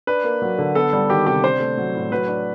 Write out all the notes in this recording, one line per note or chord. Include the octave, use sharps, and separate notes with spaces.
D4 B4
A#3
F#3
D3
B3 A4
G3
D#3 G4
C3 G4
D4 C5
A3
F#3
A2
F#3 B4
D4